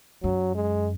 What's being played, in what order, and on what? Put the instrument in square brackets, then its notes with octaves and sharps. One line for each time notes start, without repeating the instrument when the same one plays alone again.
[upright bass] F#2 [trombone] F#3
[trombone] G#3